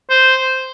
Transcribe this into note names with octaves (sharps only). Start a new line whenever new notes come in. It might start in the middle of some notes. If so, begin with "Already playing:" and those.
C5